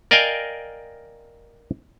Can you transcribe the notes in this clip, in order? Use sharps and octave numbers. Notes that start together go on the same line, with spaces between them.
A#4 D5 D#5 F5 G5 G#5